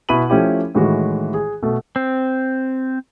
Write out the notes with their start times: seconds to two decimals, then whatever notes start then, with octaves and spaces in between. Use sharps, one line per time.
0.09 B2 E4 B4 B5 D#7 F#7
0.30 F3 A3 C#4 E4 G4
0.75 A2 D#3 E3 G#3 F#4
1.34 G#4
1.63 B2 A3
1.96 C4